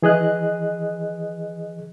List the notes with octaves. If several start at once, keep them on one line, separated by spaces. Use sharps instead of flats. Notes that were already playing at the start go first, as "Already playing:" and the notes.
E3 G#4 D#5 F#6